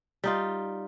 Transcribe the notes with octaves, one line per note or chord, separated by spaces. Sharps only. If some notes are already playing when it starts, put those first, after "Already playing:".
G3 D#4 F4